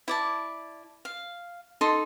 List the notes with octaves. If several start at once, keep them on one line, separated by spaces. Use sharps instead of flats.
E4 D5 A5
F5
D#4 A4 C6